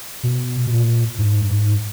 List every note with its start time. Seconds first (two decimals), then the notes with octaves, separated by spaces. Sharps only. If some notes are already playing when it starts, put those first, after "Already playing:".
0.23 B2
0.66 B2
0.71 A#2
1.18 G#2
1.39 G2
1.50 G#2